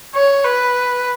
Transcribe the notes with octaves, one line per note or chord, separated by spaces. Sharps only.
C#5
B4